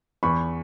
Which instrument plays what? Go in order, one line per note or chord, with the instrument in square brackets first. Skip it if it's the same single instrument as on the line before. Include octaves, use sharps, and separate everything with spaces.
[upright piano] E2 B5 C#6